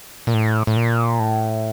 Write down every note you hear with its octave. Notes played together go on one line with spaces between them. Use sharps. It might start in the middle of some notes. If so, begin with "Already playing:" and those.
A#2
A2
A2
A#2
A2